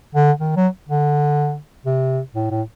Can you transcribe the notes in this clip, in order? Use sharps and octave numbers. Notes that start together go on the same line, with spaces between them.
D3
D#3
F#3
D3
C3
A2
A2